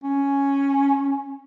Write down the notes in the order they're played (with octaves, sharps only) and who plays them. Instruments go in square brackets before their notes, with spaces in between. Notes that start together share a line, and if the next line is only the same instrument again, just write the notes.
[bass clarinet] C#4